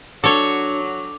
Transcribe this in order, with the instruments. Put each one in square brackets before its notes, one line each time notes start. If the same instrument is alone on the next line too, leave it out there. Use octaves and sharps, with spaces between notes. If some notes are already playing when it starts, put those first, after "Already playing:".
[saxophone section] F#3 [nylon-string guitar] D4 [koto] A4 C#5 [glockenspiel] D6 F7